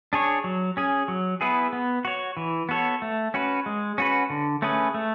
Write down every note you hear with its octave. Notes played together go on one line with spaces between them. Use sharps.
D4 G#4 C#5
F#3
C#4 G#4
F#3
B3 E4 G#4 B4
B3
F#4 C#5
E3
B3 F#4 A4 C#5
A3
C#4 F#4 B4
G#3
C#4 F#4 B4
D3
A3 C#4 G#4 B4
A3